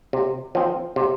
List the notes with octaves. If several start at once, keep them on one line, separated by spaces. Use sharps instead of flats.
C3
F3 C4
C3